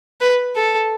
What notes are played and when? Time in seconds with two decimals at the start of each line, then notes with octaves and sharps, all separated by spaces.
0.21 B4
0.56 A4